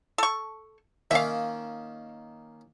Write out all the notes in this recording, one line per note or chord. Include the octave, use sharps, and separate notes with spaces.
A4 C#6
D#3 A#3 C#4 E5 F5